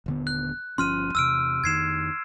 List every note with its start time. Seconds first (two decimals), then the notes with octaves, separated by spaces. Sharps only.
0.06 D#1 D3 B3
0.27 F#6
0.78 G1 F3 C#4 C6 F6 D#7
1.15 E2 C3 E6 F6 D7
1.64 F2 D#3 G#6 C7 E7